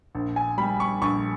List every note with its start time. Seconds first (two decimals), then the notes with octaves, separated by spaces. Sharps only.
0.15 A#1
0.36 G#5
0.58 G3 B5
0.80 C#6
1.01 A#1 C#6